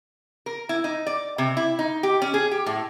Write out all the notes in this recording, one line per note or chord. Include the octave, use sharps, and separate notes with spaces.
A#4
E4
D#4
D5
C3
E4
D#4
G4
C#4
G#4
G4
A2